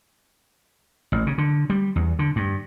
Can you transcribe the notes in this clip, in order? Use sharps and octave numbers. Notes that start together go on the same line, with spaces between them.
A1
C#3
D3
G3
E2
D3
G2